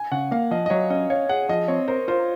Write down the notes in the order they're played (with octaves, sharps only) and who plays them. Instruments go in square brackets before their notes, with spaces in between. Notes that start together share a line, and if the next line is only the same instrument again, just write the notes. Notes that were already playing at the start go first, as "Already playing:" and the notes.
Already playing: [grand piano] G#5
[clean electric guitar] C#3 [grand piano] F#5
[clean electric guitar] A#3 [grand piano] F5
[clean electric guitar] F3 [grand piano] D#5
[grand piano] D#5
[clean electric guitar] F#3 [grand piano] C#5
[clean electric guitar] C#4 [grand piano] D#5
[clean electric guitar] C#5 [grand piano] F5
[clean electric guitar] G#4 [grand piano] F#5
[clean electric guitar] F3 [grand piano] D#5
[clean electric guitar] C4 [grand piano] C#5
[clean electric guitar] A#4 [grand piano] C5
[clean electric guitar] F4 [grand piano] C5